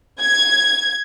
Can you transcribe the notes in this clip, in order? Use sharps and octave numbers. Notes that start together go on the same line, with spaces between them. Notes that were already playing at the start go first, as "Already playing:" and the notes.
G#6